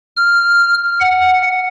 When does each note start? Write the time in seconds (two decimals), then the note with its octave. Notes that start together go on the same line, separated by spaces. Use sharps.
0.17 F6
1.00 F#5